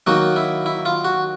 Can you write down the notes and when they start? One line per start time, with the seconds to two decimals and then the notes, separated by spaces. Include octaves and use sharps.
0.07 D#3 F#3 A#3 D#4 F#4
0.36 E4
0.66 E4
0.85 F4
1.04 F#4